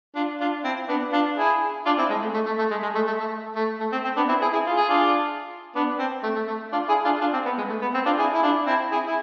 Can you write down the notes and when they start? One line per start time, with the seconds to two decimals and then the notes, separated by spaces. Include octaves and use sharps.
0.15 D4 F4
0.40 D4 F4
0.64 C4 E4
0.88 B3 D4
1.12 D4 F4
1.37 E4 G#4
1.85 D4 F4
1.98 C4 E4
2.10 G#3
2.22 A3
2.34 A3
2.46 A3
2.59 A3
2.71 G#3
2.83 G#3
2.95 A3
3.07 A3
3.20 A3
3.56 A3
3.80 A3
3.92 C4
4.04 C4
4.16 B3 D4
4.29 C4 E4
4.42 E4 G#4
4.53 E4 G#4
4.66 F4
4.77 G#4
4.88 D4 F4
5.75 B3 D4
5.99 C4
6.23 A3
6.36 A3
6.47 A3
6.72 D4 F4
6.88 E4 G#4
7.05 D4 F4
7.21 D4 F4
7.33 C4
7.45 B3
7.58 G#3
7.69 A3
7.82 B3
7.94 C4
8.06 D4 F4
8.18 E4 G#4
8.33 E4
8.42 D4 F4
8.66 C4 E4
8.91 E4 G#4
9.07 E4